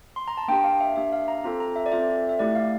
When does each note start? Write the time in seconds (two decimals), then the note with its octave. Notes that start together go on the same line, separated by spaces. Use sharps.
0.16 C6
0.28 A#5
0.37 A5
0.48 A#3 D4 G4 G5
0.64 F5
0.81 E5
0.96 A#3 D4 G4 E5
1.12 F5
1.28 A#5
1.44 C4 F4 A4 A#5
1.60 A#5
1.76 E5
1.86 D5
1.92 C4 F4 A4 E5
2.29 E5
2.39 A3 E4 G4 D5
2.55 F5